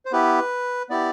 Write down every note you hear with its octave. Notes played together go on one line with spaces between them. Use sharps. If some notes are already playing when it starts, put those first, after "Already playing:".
C5
B3 E4 G4 B4
B3 E4 G4 D5